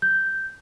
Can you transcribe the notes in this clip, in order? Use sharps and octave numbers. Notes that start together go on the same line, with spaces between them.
G6